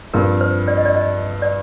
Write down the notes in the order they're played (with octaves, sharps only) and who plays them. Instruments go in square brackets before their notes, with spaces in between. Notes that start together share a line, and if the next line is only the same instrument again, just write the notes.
[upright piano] G2 F3 C4 [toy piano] A#4
[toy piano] C5
D5
D#5
D5
D#5
D5